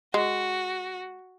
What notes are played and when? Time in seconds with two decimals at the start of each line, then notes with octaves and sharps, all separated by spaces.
0.14 G#3 F#4